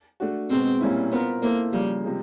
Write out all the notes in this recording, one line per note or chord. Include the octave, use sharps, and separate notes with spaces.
A3 D4 F#4
B2 G#3 B3 C4
A#2 G3 A#3 C#4 E4
B3 C4 F4 A#4
A#3 C4 E4 A4 C5
C#3 F3 G3 A#3
C3 F3 G#3